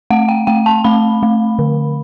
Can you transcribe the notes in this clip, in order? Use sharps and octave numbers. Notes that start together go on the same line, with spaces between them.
A3 F#5
G5
A3 G5
A5
A3 B5
A3
D3